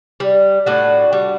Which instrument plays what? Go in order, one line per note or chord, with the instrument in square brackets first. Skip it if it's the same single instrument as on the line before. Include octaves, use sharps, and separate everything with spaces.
[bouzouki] G3
A2 D4 F#4
G3